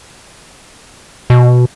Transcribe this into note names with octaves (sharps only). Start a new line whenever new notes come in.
B2